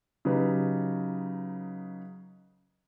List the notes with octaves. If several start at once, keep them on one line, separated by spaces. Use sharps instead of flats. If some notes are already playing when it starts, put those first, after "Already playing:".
C#3 F#3 D#4 G4 B4